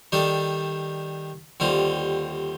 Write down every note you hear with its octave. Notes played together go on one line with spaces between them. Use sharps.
D#3 G3 D4 A4
D#2 D3 G3 C4 F4